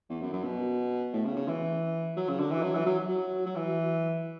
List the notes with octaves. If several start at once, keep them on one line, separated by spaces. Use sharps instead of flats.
E2
F#2
F#2
B2
A2
C#3
C#3
E3
F#3
C#3
D3
E3
F#3
E3
F#3
F#3
F#3
E3